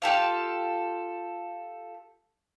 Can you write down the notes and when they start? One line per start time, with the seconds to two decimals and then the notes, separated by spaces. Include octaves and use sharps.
0.02 F4 G4 A4 F5